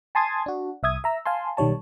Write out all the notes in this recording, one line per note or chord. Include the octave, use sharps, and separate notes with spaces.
G#5 A5 C6 D#6 G#6 A6
D4 F#4
C2 E5 D#6 G#6
E5 A#5 E6
F5 G#5 A5 C6
B1 D#3 G3 C#5 A5